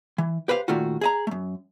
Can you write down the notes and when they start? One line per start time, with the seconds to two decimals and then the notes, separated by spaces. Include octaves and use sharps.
0.18 E3
0.48 G4 B4 C5 E5 F5
0.68 A#2 D#3 A3 F4 F#4
1.01 G#4 D#5 A#5
1.27 F#2 A3